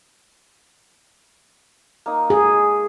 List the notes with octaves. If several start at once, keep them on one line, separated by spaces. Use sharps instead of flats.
A#3 D#4
G#4